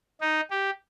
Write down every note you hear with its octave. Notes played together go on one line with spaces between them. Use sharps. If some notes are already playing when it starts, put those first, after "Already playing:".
D#4
G4